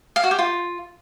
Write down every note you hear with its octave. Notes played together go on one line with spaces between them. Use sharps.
F5
F#4
G4
F4